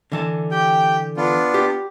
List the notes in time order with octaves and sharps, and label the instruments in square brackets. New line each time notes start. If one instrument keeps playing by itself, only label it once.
[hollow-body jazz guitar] D3 E3 A5
[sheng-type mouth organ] G4 G5
B3 D4 F4
[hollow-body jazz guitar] G4